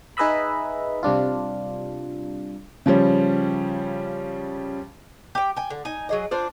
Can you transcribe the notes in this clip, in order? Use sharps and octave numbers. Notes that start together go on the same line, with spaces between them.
D#4 G#4 B4 D#5 E5 B5
C3 G3 D4 F4
C#3 F3 G3 C#4
G4 G5
G5 G#5
D3
D#4 G#5
F#3 G#4 D#5
D4 F4 C5 D5